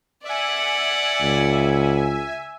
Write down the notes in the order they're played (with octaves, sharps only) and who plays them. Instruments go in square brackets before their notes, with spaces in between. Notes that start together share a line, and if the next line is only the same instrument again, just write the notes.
[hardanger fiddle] D5 F#5 [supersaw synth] E5 G#5
[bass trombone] C#2